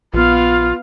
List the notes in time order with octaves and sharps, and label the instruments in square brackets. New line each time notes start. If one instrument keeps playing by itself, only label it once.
[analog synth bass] A#1 [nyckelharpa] B3 F5 [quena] F4